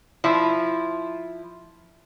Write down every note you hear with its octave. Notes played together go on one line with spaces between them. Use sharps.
F3 E4